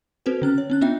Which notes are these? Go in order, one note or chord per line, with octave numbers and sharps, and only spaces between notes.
C4 F#4 A4 B4 C5
D3 C#4 F6
C#5
C4 C#4 F#6
B3 D4 F4 D#5 E5 G5